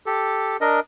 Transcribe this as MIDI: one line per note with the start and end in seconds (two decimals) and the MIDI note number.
0.06 0.57 67
0.06 0.57 69
0.61 0.80 62
0.61 0.80 70
0.61 0.80 75